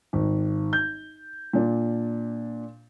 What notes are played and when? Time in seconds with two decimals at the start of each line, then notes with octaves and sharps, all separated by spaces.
0.13 G#1
0.73 G6
1.53 A#2 D4